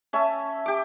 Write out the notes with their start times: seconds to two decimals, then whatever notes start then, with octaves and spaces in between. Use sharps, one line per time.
0.13 C#4 E5 G#5 A5
0.66 G4 D6